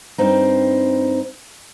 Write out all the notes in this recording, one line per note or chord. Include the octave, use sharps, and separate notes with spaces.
G2 C4 D#4